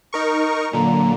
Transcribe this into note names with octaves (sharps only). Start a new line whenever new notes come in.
D#4 A#4 C#6
A#2 D3 F#3 A#3 A#5